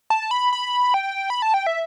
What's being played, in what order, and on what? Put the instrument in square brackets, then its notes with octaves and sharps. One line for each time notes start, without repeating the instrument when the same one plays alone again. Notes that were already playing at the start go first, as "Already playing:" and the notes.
[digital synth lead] A5
B5
B5
G5
B5
A5
G5
E5